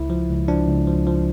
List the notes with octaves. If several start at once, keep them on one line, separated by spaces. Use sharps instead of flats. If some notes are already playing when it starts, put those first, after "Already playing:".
Already playing: C#2 E4
F3
C#2
F3 D4
C#2
F3
F3